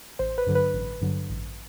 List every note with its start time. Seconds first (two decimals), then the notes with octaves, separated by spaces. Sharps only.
0.19 A1 C5
0.38 B4
0.47 G2 D3 F#3
0.55 B4
0.74 A1
1.02 G2 D3 F#3
1.30 A1